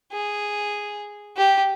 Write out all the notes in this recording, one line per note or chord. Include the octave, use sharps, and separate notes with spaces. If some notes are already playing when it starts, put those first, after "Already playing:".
G#4
G4